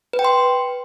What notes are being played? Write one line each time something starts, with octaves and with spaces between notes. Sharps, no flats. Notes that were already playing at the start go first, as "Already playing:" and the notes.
B4
G5
C6